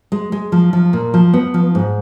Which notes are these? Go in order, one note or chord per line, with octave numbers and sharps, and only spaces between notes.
G#3
G#3
F3
F3
A#2
F3
B3
F3
G#2